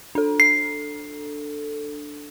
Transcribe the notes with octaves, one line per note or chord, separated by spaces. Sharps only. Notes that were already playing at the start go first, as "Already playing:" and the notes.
D4 A4
C7